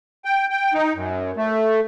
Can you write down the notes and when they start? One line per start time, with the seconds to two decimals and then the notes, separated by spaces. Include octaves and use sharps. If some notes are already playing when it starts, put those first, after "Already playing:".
0.25 G5
0.50 G5
0.73 D#4
0.95 F#2
1.37 A3